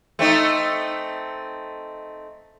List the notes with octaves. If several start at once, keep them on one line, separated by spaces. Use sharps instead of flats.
A3 C4 D#4